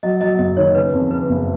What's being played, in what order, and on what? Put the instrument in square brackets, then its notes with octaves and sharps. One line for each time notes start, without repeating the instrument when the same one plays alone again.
[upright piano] F#3 [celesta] D#5
[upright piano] F#3 [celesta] D#5
[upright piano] F#1 [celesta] D#5
[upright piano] D#3 [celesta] C#5
[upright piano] C#3 [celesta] B4
[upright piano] F2
[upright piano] C#3 [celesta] B4
[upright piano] F#1